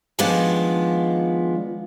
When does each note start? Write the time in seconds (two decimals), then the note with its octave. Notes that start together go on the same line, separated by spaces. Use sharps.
0.19 D#3 F3 G#3 B3 D4 F4